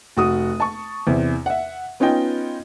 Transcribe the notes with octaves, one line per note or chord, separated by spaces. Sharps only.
F1 F#4 D#6
A5 C#6
E2 C3
E5 F#5
B3 C#4 D#4 F4 D#5 G5